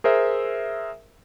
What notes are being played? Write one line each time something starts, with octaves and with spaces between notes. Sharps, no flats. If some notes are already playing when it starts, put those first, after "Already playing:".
G#4 A#4 C5 E5